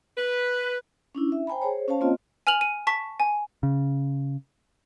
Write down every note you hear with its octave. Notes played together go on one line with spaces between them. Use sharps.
B4
C#4 D4 E4
E5
C5 G5 G#5 A#5 B5
G#4 C5 C#5
C#4 C5 C#5 F5 A5
A#3 C4 F4 D#5
G#5 F6 F7 F#7
D#7
A5 C#6 B6
G#5
C#3